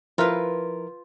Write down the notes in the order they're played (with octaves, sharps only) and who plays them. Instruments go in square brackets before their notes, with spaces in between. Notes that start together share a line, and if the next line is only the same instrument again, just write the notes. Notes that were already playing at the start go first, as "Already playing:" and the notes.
[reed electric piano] F3 E4 A#4 [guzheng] F4 B4